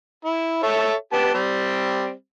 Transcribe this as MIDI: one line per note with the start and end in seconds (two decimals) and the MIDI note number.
0.25 0.61 64
0.63 0.93 69
0.63 0.93 73
0.63 0.93 76
1.13 1.33 59
1.13 1.33 67
1.13 1.33 81
1.34 2.13 55
1.34 2.13 60